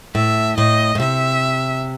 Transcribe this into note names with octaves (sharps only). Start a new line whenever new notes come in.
A2 E5
A2 D#5
A2
C3 E5